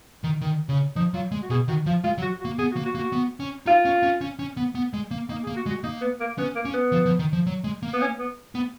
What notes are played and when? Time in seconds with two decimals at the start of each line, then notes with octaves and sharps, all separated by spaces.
0.24 D#3
0.41 D#3
0.69 C#3
0.96 F3 D#4
1.14 F#3 F4
1.32 G#3
1.42 F#4
1.50 B2 G#4
1.68 D#3 F#4
1.86 F3 F4
2.04 G#3 F4
2.18 F#3
2.22 F#4
2.40 F#4
2.45 A#3
2.59 B3 G#4
2.72 F#4
2.76 A#3
2.85 F#4
2.95 A#3
2.99 F#4
3.13 B3
3.40 C#4
3.66 D#4 F4
3.85 C#4
4.03 C#4
4.21 C#4
4.39 C#4
4.57 B3
4.75 B3
4.94 G#3
5.11 A#3
5.29 A#3 D#4
5.43 G#4
5.47 A#3
5.56 F#4
5.66 G#3
5.70 F#4
5.83 A#3 D#4
6.01 B3
6.20 A#3
6.38 B3 C#4
6.55 A#3
6.65 C#4
6.73 B3
6.92 F3
7.06 F3
7.19 D#3
7.33 F3
7.47 F#3
7.64 G#3
7.83 A#3
7.93 B3
8.01 C#4
8.19 B3
8.55 B3